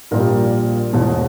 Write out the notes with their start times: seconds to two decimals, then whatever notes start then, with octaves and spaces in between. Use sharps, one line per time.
0.11 A#1 A#2 G3 A#4
0.93 E1 E2 B2 G#3